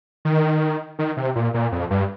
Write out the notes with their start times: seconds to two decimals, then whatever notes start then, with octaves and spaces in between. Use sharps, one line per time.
0.25 D#3
0.99 D#3
1.17 C3
1.36 A#2
1.54 A#2
1.72 F2
1.90 G2